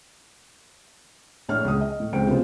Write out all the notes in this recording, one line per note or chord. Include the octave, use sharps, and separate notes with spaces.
A#1 A2 D4 C#5 F6
C#2 D#6
D#5
A2
C#2 C4 G5 D7
F1 C#3 B3 F4 C5